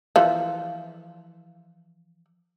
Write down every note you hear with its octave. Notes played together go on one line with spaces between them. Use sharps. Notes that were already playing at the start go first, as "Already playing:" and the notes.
E3 F3